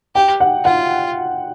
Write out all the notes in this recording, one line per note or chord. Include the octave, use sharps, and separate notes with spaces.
G4 G5
F#5
F4 F#5